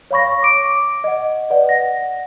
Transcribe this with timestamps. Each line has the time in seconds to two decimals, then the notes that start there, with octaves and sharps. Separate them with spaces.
0.11 C#5 F5 B5 C#6 A#6
0.43 D6 D7
1.04 D#5 F#5
1.50 B4 D5 D#5 F#5
1.69 F#5 A#6